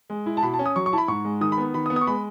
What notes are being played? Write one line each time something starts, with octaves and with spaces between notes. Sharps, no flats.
G#3
E4
A5
B2 B5
A5
C#4
D#6
F#3 C#6
C#6
E4 A5
B5
G#2 C#6
G#3
D#3 D#6
B5
B3
D#3 B5
D#6
B3
D#6
C#6
G#3 B5